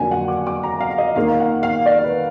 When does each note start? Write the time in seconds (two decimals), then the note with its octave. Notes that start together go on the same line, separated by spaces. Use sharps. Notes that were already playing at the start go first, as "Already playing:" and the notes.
Already playing: F2 D3 F#3 A#3 G#5
0.11 F#5
0.28 D6
0.47 D6
0.64 A#5
0.80 F5
0.98 D#5
1.16 D#2 D#3 A#3 F5
1.40 F#5
1.63 F5
1.86 D5
2.04 B4